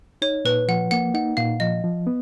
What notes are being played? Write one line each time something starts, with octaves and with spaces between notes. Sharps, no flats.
D#4 C#5
A#2 B4
F3 F#5
A#3 F#5
D#4 F#5
A#2 F5
F3 D#5
F3
B3